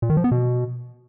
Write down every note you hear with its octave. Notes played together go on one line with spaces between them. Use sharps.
A#2
D#3
F3
B3
B2